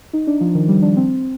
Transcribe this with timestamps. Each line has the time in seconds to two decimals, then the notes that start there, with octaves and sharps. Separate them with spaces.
0.13 D#4
0.27 D4
0.41 F3
0.55 D#3
0.68 G3
0.82 D4
0.96 C4